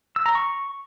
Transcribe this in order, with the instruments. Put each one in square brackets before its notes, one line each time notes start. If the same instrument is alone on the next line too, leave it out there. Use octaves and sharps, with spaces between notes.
[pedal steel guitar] E6
A#5
C#6